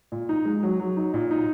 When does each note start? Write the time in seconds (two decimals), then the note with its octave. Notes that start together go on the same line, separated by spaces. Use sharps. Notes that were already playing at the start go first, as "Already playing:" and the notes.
0.12 A#2
0.29 D#4
0.45 G#3
0.63 F#3
0.79 F#3
0.97 D#4
1.14 A#2
1.31 D#4